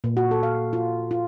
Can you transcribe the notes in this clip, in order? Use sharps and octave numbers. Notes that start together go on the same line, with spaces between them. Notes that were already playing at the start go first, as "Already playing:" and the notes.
A#2
F#4
A4
F5
F4
F4